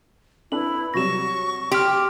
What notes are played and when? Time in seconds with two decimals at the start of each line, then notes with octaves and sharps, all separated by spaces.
0.52 D4 E4 A4 B4 F#7
0.94 C3 F#3 G3 C#6 A#6 E7
1.72 G4 C6 D6 F6